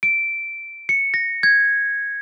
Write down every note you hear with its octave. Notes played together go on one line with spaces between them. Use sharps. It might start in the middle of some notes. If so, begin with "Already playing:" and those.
D7
C#7
A#6
G#6